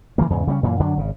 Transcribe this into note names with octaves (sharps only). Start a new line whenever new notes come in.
C#3 E3 F3 A#3
E2 G#2 C#3
C#3 G3 B3 C#4
F#2 A#2 E3 A#3
F#2 D3 F#3 D4
G#1 C#3